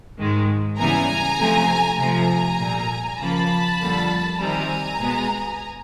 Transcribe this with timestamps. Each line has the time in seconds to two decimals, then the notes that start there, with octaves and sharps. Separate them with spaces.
0.18 G#2 D#3 G#3
0.79 C#3 E3 G3 B3 G#5 A#5
1.39 C3 F3 A3 C4
1.98 C3 F3 A3 G#5 A#5
2.60 A#2 G3 A#3
3.19 C#3 F3 A#3 A5 B5
3.80 F2 D3 G3 A#3
4.40 C3 D#3 G3 C4 G#5 A#5
5.00 B2 G#3 B3